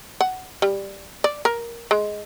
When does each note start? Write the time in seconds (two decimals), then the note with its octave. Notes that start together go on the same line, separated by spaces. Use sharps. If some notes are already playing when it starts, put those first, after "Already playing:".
0.21 F#5
0.62 G3
1.24 D5
1.45 A#4
1.91 G#3